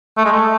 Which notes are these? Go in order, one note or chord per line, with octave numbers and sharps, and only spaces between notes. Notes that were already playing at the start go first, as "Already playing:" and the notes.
A3
G#3
A3